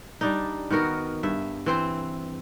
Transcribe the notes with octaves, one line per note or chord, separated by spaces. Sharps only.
G3 D4 D#4
D#3 B3 F#4 A#4
G2 E5
E3 C4 C5